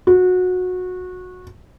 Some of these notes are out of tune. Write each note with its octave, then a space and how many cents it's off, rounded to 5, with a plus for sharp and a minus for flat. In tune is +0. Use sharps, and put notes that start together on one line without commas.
F#4 -20